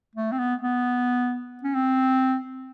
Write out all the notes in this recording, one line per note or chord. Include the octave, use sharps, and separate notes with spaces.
A3
C4
B3
B3
C#4
C4